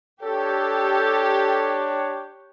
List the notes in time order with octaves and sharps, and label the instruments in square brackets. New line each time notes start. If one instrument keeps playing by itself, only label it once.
[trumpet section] D4 C#5 [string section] G4 [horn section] A4